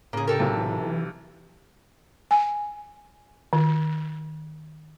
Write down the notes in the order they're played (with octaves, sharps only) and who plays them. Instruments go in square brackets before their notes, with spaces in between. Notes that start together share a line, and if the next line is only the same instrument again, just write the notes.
[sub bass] A2 [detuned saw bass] C#3 [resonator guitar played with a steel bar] A#3 G#4
[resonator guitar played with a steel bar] G4 A4 A#4
[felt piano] B1 C3
[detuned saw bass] E3
[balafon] G#5
D#3